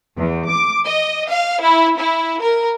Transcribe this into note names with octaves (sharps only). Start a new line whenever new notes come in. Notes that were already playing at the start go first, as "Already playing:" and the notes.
E2
D6
D#5
F5
E4
E4
A#4